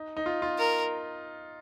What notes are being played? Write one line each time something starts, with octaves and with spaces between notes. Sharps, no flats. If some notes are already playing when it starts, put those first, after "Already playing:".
Already playing: D#4
D#4
F4
F4
A#4